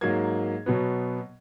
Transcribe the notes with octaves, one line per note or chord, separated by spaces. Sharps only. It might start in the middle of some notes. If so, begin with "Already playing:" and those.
G#2 F#3 A#3 G#6
B2 F#3 B3